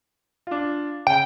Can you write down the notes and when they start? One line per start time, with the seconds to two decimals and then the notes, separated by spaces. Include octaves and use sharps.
0.47 D4 F4
1.07 C#3 G5